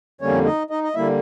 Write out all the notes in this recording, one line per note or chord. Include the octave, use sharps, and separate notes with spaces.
F2 D3 G3 A#3 C#4 C#5
D#4 D#5
D#4 D#5
D#5
D3 G3 A#3 E4 E5